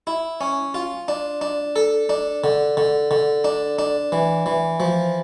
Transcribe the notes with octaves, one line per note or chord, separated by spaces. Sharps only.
E4
C#4
F4
D4
D4
A4
D4
D3
D3
D3
D4
D4
E3
E3
F3